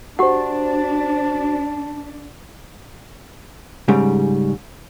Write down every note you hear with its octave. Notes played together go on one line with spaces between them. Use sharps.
D4 F#4 G4 C5 F#5 A5
G#2 C#3 G3